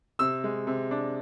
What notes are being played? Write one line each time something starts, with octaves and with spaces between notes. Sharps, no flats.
C3 E6
G#3
C3
D4